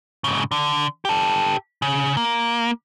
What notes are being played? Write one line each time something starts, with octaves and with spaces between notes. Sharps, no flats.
G#2 C#3
D3
G4 A4
C#3
A#3